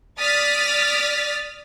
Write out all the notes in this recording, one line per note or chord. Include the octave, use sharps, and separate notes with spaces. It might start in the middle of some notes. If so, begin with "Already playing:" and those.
D5 D#6 F6 A6 B6